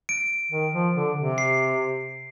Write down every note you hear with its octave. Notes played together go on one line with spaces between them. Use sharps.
D7
D#3
F3
D3
C3
C7